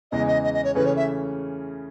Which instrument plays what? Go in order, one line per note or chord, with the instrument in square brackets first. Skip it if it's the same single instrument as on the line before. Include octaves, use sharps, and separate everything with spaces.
[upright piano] E2 C#3 E3 G#3 [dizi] D#5
[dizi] D#5
D#5
D#5
C#5
[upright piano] C#3 E3 A3 C#4 [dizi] B4
[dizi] C#5
E5